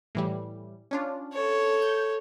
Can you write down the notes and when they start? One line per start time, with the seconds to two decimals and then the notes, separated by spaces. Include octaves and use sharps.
0.15 A2 E3 G3
0.91 C#4 D4 F4
1.33 A4 C#5
1.82 G6